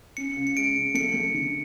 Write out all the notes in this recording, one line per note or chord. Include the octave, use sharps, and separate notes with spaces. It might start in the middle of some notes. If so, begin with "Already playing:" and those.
C#4 C#7
C#2
C#7
G#3 D7
C#3
A3 C#7
A3
D3